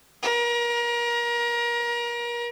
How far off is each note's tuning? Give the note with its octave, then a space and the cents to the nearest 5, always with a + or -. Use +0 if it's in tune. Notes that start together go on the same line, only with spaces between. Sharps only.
A#4 +30